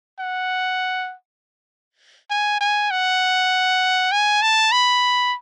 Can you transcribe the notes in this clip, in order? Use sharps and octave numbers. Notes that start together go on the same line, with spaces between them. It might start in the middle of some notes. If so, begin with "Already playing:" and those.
F#5
G#5
G#5
F#5
G#5
A5
B5